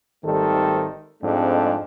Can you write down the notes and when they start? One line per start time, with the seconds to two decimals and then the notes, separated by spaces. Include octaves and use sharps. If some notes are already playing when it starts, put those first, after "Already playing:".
0.24 G#1 D#3 G3 A3 A4 C5
1.23 F2 G#2 G#3 A3 C4 D4